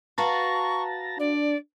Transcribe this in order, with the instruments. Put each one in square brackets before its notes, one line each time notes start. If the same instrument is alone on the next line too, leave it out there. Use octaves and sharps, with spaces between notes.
[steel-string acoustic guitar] F#4 B4 F5 [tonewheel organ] A5 A#5 [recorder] C#6
[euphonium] D4 [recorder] D5